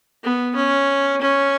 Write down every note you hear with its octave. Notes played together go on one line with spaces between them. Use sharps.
B3
C#4
C#4